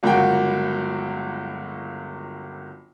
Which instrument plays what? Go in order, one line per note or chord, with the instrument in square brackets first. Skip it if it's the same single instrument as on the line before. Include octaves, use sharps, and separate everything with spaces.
[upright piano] G1 C#2 F#3 A#3 F#4 G5